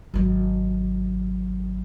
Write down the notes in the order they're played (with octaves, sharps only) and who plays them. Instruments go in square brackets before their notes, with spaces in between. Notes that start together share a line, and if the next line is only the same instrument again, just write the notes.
[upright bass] G#1 F#3